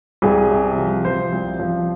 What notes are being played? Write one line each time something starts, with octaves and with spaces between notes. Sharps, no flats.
C2 G#4
C3
F3
F3 C5
C2
F3